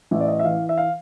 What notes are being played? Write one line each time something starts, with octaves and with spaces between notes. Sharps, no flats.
A1 E5
D5
D#5
E5
E3 F5
E5
F5